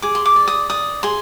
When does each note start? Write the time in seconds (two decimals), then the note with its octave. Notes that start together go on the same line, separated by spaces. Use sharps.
0.02 G#4 D6
0.15 C6
0.26 D6
0.36 D5
0.48 D#6
0.70 D5 D#6
1.03 G#4 C6